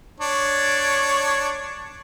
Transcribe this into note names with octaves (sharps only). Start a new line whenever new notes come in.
D4 C#5